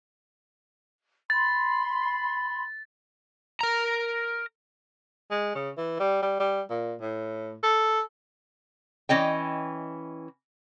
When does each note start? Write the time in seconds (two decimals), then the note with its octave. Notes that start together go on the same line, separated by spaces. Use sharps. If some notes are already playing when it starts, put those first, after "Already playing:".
1.30 B5 C6 A6
3.61 A#4 A#5
5.31 G#3
5.55 C#3
5.77 E3
6.00 G3
6.22 G3
6.40 G3
6.70 A#2
7.01 A2
7.63 A4
9.09 E3 C#4 D#5 G5